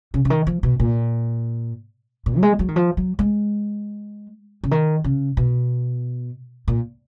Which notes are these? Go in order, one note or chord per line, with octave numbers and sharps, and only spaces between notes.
C#3
C#3
D#3
F3
B2
A#2
A#2
F#3
G#3
F#3
D#3
F3
F#3
G#3
C#3
D#3
C#3
B2
A#2